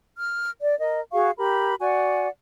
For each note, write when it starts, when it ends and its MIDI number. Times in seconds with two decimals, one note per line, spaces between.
0.18 0.50 89
0.61 0.78 74
0.79 1.00 70
0.79 1.00 75
1.12 1.30 66
1.12 1.30 68
1.12 1.30 77
1.12 1.30 85
1.37 1.75 67
1.37 1.75 70
1.37 1.75 83
1.80 2.28 66
1.80 2.28 74
1.80 2.28 78
1.80 2.28 80